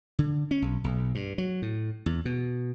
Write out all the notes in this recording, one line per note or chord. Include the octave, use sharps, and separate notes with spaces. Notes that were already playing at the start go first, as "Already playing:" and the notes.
D3
C#4
B1
B1
G2
F#3
A2
E2
B2